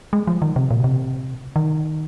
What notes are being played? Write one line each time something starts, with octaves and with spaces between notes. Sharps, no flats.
G#3
F3
D#3
C3
A#2
C3
D#3